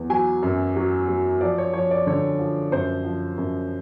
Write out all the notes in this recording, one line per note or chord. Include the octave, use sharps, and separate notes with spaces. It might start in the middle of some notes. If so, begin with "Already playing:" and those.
Already playing: E2
F#3 G#5
F#2
F#3
F#3
F3 D5
C#5
F3 C#5
D5
D3 C#5
F3
F#2 C5
F3
F#2